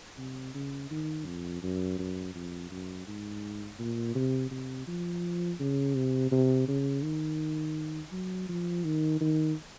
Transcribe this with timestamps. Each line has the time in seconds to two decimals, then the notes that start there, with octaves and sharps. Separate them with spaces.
0.18 C3
0.55 C#3
0.91 D#3
1.27 F2
1.63 F#2
1.99 F#2
2.35 F2
2.71 F#2
3.07 G#2
3.79 A#2
4.15 C3
4.51 C3
4.88 F3
5.60 C#3
5.96 C3
6.31 C3
6.68 C#3
7.04 D#3
8.12 F#3
8.49 F3
8.84 D#3
9.21 D#3